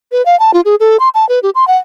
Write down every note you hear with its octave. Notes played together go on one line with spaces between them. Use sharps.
B4
F5
A5
F4
G#4
A4
C6
A5
B4
G4
C6
F#5